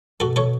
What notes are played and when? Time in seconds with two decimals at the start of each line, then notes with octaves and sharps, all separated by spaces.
0.20 B2 F#4 A4
0.36 A4 C#5